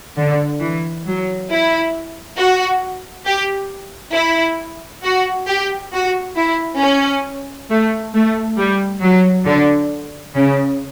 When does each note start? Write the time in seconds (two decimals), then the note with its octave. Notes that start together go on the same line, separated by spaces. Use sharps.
0.17 D3
0.61 E3
1.06 F#3
1.50 E4
2.38 F#4
3.26 G4
4.15 E4
5.04 F#4
5.48 G4
5.93 F#4
6.37 E4
6.81 C#4
7.69 A3
8.14 A3
8.58 G3
9.02 F#3
9.46 D3
10.35 C#3